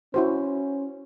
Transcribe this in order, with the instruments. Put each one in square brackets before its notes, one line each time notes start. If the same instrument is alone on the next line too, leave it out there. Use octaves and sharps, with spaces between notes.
[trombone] C#4 [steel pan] E4 F#4 C5